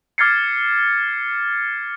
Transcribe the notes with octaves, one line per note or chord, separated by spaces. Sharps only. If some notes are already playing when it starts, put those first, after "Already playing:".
D6 F6 G#6 A6 C7 C#7